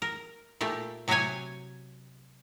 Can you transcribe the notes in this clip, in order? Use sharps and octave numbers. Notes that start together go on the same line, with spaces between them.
A#4
A#2 A3 G4
C3 F#3 F#4 G4 C#5 G#5